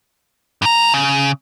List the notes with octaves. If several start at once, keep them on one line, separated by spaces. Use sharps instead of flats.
G2 A#5
C#3